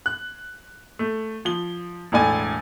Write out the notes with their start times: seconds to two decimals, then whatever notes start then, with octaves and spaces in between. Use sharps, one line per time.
0.06 F#6
0.99 A3
1.45 F3 G7
2.12 E1 A2 D5 G#5